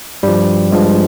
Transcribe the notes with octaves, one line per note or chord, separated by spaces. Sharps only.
G2 F3 G3
G2 F3 G#3